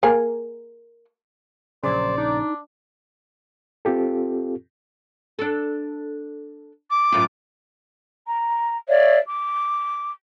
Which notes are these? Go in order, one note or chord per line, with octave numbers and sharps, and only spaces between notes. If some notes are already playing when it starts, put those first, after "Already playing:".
A#3 G#4 A#4
A#1 C#3 F#3 C5 D5
D4 D#4
C4 F4 G4 A4
D4 A4
D6
F#2 A2 F4
A#5
C#5 D5 E5 F5
D6